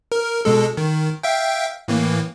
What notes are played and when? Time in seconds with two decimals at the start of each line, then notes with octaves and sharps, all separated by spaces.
0.12 A#4
0.45 B2 G#3 A4
0.77 D#3
1.23 E5 F5 G5
1.88 A2 E3 A#3